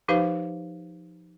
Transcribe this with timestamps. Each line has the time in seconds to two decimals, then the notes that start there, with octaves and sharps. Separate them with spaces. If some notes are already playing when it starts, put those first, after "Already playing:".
0.08 F3 D#4 G4 B4 C5 F5